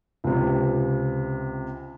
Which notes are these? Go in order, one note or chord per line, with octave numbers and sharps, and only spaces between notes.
C#2 C3